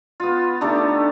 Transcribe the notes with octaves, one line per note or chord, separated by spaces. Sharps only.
B3 F4
D3 A3 D#4 G4